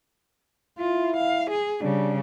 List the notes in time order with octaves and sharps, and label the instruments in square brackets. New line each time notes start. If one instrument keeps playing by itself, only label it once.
[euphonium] E4 [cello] F4
[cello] F5
G#4
[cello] C#3 G3 [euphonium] D4